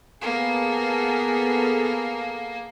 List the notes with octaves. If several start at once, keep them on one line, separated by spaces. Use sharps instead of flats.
A#3 B3 G#4 A4